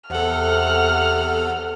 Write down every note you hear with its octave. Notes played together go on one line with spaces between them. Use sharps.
E2 C3 A4 F#5 F6